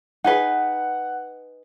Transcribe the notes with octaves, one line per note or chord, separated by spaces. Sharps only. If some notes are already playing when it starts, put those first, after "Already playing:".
D#4 G#4 B4 F#5